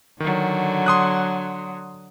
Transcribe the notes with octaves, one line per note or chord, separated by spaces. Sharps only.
D3 D#3 F#3
C6 D#6 F#6